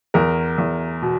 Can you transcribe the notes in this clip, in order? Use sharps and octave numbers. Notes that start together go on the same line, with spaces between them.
E2 A#4
E2
B2